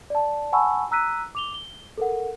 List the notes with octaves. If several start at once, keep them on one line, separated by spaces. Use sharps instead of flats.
D5 A5
F#5 G#5 A5 B5 C#6 E6
A#5 E6 F#6 B6 D#7
D6 F7 G7
G7
A4 A#4 F#5